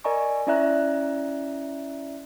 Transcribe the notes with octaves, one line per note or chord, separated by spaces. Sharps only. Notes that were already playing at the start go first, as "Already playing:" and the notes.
A#4 D5 D#5 G#5 A#5 C#6
C#4 E4 D5 E5 A#5 F#6